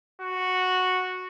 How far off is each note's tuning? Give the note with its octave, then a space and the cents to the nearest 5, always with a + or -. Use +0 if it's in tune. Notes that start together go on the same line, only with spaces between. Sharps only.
F#4 -5